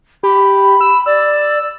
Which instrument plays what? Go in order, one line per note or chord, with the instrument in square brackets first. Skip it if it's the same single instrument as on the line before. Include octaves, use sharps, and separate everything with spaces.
[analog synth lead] G4 [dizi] B5
[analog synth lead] E6
[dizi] D5 [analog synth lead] E6